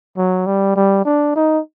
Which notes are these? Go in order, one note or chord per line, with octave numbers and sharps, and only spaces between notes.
F#3
G3
G3
D4
D#4